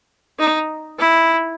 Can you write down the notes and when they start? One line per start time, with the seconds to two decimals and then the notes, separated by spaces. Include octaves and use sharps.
0.39 D#4
0.99 E4